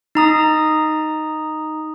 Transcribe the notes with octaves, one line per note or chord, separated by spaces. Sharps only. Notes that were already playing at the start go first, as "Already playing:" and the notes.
D#4 A#5 D#6